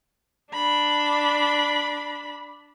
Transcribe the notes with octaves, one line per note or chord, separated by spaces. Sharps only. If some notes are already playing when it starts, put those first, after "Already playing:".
D4 B5